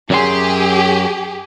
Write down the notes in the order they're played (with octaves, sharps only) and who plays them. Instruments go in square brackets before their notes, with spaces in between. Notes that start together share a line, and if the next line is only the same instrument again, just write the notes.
[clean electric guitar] F#2 F#3 C6 [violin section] G4 G#4